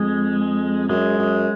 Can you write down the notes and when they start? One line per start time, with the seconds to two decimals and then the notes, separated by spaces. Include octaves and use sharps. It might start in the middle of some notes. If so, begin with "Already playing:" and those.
Already playing: F2 G#3
0.89 F#2 G#3
1.18 F#2